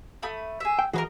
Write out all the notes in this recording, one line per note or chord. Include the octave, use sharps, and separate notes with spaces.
A3 B5 D#6
G#4 E5
G5
E3 F#4 G#4 A#4 B4 D#5